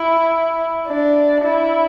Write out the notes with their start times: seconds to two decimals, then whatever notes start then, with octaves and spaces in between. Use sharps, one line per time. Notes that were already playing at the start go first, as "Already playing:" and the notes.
Already playing: E4
0.88 D4
1.44 E4